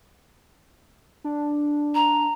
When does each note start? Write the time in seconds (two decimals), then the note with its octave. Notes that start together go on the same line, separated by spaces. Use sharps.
1.24 D4
1.95 A#5